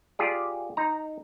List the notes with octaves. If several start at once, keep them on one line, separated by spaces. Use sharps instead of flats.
F4 G4 G#4 D5
D#4 A#5